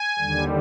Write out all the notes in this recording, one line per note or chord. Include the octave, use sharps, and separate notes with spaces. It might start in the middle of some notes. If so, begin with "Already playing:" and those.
Already playing: G#5
D#2 D3 G3